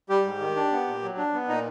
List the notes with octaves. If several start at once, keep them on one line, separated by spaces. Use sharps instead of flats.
G3 G4
G#2
D#3
D4
B3
A#2
F#3
D4
B3
A#2 D#4